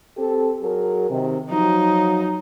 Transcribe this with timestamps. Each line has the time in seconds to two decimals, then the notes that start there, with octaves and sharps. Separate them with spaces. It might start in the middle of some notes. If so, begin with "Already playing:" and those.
0.17 C4 G4 A4
0.61 F#3 G#4 A#4
1.11 C3 D#3
1.50 F3 F#3 D#4